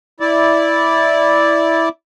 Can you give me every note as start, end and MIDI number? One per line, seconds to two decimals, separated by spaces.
0.20 1.89 64
0.20 1.89 74